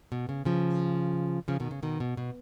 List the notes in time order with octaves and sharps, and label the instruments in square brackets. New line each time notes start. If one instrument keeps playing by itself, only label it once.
[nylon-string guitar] B2
C#3
C#3 F3
C#3 F3
B2 D#3
C#3
B2 D#3
B2
B2